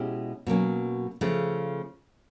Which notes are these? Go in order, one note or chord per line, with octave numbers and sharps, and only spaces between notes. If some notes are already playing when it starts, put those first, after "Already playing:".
Already playing: B2 G#3 C#4 E4 G4
B2 F#3 A#3 C#4
C#3 F3 A3